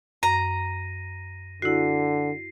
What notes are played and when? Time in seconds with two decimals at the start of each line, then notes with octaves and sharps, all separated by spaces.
0.23 F#2 A#5 A#6 D#7
1.62 D3 E4 F#4 C7